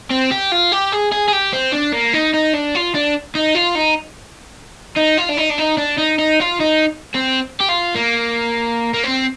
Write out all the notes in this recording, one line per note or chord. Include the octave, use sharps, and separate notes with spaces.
C4
G4
F4
G4
G#4
G#4
G#4
G4
C4
D4
A#3
D#4
D#4
D4
F4
D4
D#4
F4
D#4
D#4
F4
D4
D#4
D4
D#4
D4
D#4
D#4
F4
D#4
C4
G4
F4
A#3
A#3
C4